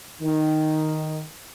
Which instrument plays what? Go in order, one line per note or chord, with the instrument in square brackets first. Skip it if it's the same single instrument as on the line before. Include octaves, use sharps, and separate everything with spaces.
[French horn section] D#3